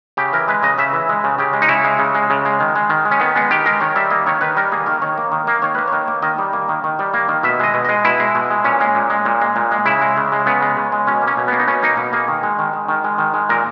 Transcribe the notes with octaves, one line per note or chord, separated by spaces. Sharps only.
C#3 G4
E3 A#4
G#3 B4
C#3 D#5
C#3 E5
E3
G#3
C#3
C#3 G4
G#3
D#4
C#3 E4
G#3
C#3
G#3
C#3
G#3
D#3
G#3
D#3
G#3
C#4
D#3 B3
G#3 B3
D#3 G4
G#3 A#4
D#3 C#5
G3 E5
A#3 D#5
D#3 C#5
D#3 B4
G3 A#4
A#3 G#4
D#3 A#4
D#3 C#5
A#3
D#3
A#3
D#3 C#5
A#3 B4
D#3 C#5
A#3
D#3 D#5
G3
A#3
D#3
D#3
G3
A#3
D#3
B2 E5
G#3 D#5
B2
G#3 D#5
B2 E4
G#3
B2
G#3
A#2 C#4
G#3
A#2
G#3
A#2
G#3
A#2
G#3
C#3 E4
G#3
C#3
G#3
C#3 B3
G#3
C#3
G#3
B2 C#4
A#3
C#4
B2
A#3 B3
D#4
B2 C#4
A#3 D#4
B2
A#3 G#4
D#3
G#3
D#3
G#3
D#3
G#3
D#3
G#3
A#2 A#4